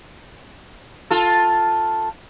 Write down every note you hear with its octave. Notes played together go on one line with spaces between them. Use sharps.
F4 A4